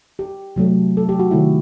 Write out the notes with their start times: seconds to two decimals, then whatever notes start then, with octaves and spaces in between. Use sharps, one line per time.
0.19 G4
0.56 C3 F#3 A3
0.97 A4
1.09 G4
1.19 F#4
1.31 C3 D#3 A3 E4